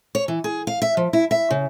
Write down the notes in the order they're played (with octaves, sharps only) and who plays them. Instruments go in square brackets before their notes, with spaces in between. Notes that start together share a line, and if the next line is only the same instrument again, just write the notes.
[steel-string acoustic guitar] C#5
E3
G#4
F5
E5
F3
E4
E5
C#3